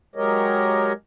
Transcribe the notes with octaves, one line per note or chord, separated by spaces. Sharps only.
F#3 G#3 G4 A#4 C#5 D#5